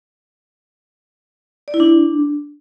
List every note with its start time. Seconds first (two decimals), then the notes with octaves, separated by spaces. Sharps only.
1.68 D5
1.74 E4
1.80 D4